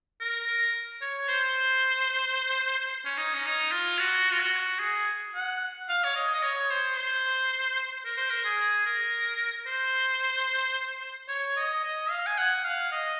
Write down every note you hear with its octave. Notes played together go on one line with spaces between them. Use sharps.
A#4
A#4
C#5
C5
C#4
D#4
C#4
D#4
F4
F#4
F4
F#4
G#4
F#5
F5
C#5
D#5
D#5
C#5
C5
C5
A#4
C5
A#4
G#4
A#4
C5
C#5
D#5
D#5
F5
G#5
F#5
F5
D#5